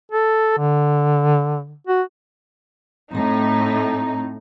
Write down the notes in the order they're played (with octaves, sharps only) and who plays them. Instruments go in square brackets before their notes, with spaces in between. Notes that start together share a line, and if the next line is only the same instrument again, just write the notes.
[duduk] A4
D3
F#4
[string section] A2 D#4 [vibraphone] C4 A#5